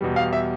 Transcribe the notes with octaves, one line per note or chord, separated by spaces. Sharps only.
E2 B2 G3
F5
E5